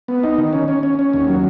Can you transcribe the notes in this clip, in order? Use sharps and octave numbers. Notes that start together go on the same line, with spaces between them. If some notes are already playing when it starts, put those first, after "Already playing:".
B3
D#4
D#3
C#4
C#4
C#4
C#4
D#2
F#3